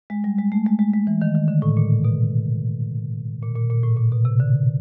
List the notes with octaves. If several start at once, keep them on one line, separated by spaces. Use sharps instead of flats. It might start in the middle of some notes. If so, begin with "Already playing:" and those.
G#3
G3
G#3
A3
G#3
G#3
G#3
E3
D#3
D#3
D3
A2
A#2
B2
A#2
A#2
A#2
A2
A#2
B2
C3
D3